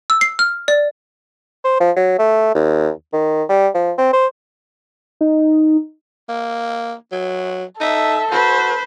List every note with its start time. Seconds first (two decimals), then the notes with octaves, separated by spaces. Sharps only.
0.10 E6
0.21 C7
0.39 F6
0.68 D5
1.64 C5
1.80 F3
1.97 F#3
2.19 A3
2.55 D#2
3.13 D#3
3.49 G3
3.74 F3
3.98 C4
4.13 C5
5.21 D#4
6.29 A#3
7.12 F#3
7.81 D#4 A4 E5
8.32 F#4 B4 C5